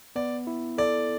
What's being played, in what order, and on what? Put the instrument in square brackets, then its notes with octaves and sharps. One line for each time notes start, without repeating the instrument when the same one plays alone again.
[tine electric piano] B3 [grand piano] D5
[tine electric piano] E4
[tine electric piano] A4 [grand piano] D5